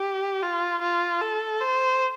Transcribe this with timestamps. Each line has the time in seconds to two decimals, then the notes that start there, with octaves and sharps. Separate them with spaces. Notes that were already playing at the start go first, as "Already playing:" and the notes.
Already playing: G4
0.43 F4
0.82 F4
1.21 A4
1.60 C5